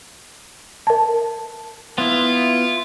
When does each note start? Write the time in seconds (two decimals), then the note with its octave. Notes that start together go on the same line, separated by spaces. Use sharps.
0.87 A#4 A5
1.98 B3 E4 F4